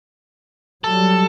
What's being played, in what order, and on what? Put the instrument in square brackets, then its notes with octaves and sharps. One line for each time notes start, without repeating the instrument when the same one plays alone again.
[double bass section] F#3 G3 [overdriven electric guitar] A4